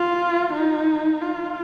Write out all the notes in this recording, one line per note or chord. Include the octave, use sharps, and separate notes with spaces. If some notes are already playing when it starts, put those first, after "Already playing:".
Already playing: F4
D#4
F4